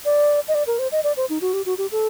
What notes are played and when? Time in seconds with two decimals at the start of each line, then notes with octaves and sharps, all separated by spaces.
0.05 D5
0.48 D#5
0.55 D5
0.67 A#4
0.79 C5
0.92 D#5
1.04 D5
1.17 C5
1.30 D#4
1.41 F#4
1.53 G4
1.66 F#4
1.78 G4
1.92 A4